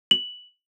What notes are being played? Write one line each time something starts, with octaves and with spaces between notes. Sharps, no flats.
F#7